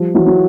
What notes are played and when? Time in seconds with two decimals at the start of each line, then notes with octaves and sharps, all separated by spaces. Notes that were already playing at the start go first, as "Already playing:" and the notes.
Already playing: F3 G3
0.14 E3 F#3
0.27 F#3